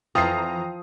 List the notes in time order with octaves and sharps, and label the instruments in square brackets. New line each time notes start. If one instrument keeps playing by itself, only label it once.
[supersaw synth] F2 E3 A#5 [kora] F3 [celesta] G5 [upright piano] D#6 C7